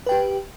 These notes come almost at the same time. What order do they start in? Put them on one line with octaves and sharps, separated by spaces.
B4 G5 G4